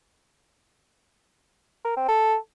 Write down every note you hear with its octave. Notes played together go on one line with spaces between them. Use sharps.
A#4
C4
A4